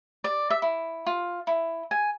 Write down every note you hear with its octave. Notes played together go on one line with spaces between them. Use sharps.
D5
E5
E4
F4
E4
G#5